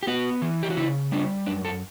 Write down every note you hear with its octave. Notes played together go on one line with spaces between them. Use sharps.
G4
B3 F#4
E3
G4
F#4
C#3 E4
G3 D4
F#2 D4
A4